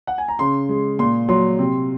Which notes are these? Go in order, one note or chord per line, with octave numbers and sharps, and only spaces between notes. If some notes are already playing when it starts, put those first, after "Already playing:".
F#5
G#5
A#5
C#3 C6
G#3
A#2 C6
F#3 C6
C3